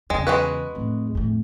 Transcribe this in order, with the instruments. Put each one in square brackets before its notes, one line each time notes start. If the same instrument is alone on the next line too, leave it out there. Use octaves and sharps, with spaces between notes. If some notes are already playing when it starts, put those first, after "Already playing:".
[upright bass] E2 C#3 [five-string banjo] G#3
[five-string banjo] G#3 F#4 B4
[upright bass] F2 A2
F2 A2